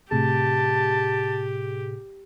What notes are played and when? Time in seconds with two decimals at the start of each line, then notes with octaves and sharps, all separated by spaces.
0.11 A2 C3 G4 G#4 A5